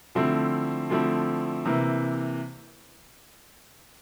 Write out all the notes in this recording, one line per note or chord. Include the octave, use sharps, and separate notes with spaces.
D3 F3 A3 C4 E4
D3 F3 A3 C4 E4
C3 E3 A#3 E4